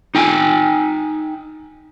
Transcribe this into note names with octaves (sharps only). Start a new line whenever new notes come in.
D#4 G5 G#5